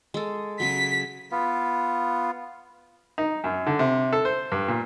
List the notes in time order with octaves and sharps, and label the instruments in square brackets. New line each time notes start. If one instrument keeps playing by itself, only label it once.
[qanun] G#3 A4
[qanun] C#3 F#3 [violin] B6
[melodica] B3 F4
[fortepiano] D#4
F#2
D3
C3
A4
C5
G2
A#2